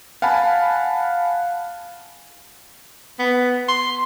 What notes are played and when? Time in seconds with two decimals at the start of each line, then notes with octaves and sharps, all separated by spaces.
0.22 F5 F#5 G#5 A5 B5
3.19 B3
3.68 C6